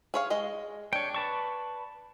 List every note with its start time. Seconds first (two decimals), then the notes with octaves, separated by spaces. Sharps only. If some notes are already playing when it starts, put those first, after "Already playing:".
0.14 G#4 C#5 F5
0.30 G#3 G#4 D#5
0.93 D4 C#5 G5
1.15 B4 A5 C#6